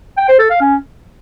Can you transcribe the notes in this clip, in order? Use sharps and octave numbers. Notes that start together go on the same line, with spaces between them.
G5
C5
A4
F5
C#4